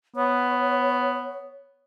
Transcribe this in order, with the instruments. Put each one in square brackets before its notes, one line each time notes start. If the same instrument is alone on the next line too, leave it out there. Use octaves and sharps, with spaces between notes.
[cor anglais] B3 [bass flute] C#5